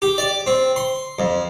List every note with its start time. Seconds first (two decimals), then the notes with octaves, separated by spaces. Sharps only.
0.02 G4
0.18 D5
0.47 C4
0.76 C6
1.19 F2